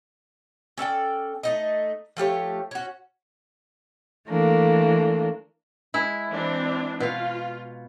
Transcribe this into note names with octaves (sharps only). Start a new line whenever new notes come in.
C#4 A4 D5 G5
A3 D#4 D#5
F3 A3 G4 C#5
C#4 F#4
E3 A3 A#3 D4
G#3 E4
E3 C4 D4
B2 F4 F5